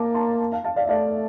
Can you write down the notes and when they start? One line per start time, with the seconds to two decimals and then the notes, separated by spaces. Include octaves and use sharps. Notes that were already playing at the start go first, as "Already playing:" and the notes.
Already playing: A#3 A5 A#5 D6
0.14 A5 C6
0.52 F5 A5
0.64 F5 A5
0.76 D5 F5
0.83 E5
0.89 A3 D5 F5